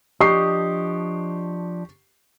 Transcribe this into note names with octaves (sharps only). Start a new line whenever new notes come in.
F3 D4 G4 D#5 C#6 C7